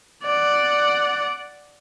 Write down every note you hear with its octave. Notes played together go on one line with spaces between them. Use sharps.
D5 F#5